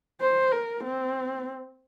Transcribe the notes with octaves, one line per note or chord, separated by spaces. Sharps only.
C5
A#4
C4